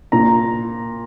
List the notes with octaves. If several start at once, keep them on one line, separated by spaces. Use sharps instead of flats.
A#2 A#5